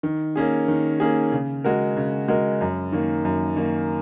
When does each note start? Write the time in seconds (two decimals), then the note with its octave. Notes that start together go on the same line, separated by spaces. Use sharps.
0.03 D#3
0.36 A#3 C#4 G#4
0.68 D#3
1.00 A#3 C#4 G#4
1.32 C#3
1.64 G#3 F#4 A#4
1.97 C#3
2.28 G#3 F#4 A#4
2.61 F#2
2.92 D#3 A#3
3.25 F#2
3.56 D#3 A#3